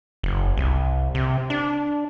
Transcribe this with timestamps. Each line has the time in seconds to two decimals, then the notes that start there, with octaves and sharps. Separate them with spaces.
0.23 F#1
0.57 C2
1.15 C3
1.50 D4